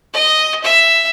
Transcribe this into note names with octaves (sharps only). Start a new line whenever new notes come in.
D#5
E5